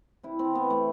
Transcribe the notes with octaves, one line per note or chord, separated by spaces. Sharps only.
C3 E4
C4
E3
B3
C3
A3